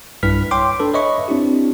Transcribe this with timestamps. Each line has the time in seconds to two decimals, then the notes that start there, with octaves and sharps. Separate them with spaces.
0.23 B1 G2 E4 B4 F6 B6
0.51 C#5 G5 C6 D6
0.79 D4 A4 B4
0.94 B4 C#5 D#5 E5 B5 C#6
1.28 C4 D4 E4 G4